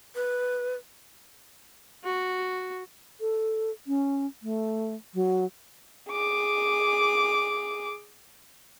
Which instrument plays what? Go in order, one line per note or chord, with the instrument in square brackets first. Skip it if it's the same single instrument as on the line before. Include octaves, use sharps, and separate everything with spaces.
[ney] B4
[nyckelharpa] F#4
[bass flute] A4
C#4
A3
F#3
[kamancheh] G#4 D6